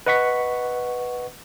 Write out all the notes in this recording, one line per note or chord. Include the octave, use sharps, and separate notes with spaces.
B4 D#5 F#5 C#6 B6